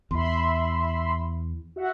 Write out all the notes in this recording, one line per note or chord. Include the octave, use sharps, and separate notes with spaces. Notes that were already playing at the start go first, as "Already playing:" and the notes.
E2 E5 B5 C6
F#4 E5 F#5